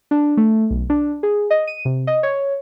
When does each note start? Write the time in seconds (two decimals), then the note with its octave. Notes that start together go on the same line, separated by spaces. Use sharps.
0.11 D4
0.37 A3
0.70 B1
0.90 D4
1.23 G#4
1.50 D#5
1.67 D#7
1.85 C3
2.07 D#5
2.23 C#5